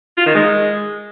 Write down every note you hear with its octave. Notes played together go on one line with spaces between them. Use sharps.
F4
D#3
G#3